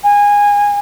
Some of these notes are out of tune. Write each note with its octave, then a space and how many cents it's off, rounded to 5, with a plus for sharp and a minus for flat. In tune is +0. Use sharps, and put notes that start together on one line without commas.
G#5 -20